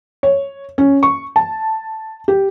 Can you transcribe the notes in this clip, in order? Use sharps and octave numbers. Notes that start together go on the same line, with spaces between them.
C#5
C#4
C#6
A5
G4